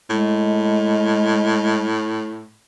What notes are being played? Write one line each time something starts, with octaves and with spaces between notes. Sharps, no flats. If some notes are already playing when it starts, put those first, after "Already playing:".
A2 G#3